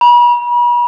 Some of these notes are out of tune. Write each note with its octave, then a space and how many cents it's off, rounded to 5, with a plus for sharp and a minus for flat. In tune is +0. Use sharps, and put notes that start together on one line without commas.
B5 -40